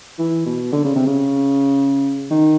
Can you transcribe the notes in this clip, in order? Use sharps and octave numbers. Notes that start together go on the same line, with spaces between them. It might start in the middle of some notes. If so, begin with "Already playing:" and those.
E3
B2
D3
C#3
C3
C#3
D#3